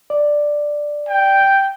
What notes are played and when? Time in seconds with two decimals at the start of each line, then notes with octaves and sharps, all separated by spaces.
0.10 D5
1.08 G5